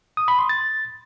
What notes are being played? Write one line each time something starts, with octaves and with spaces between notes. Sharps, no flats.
D#6
B5
C6
A6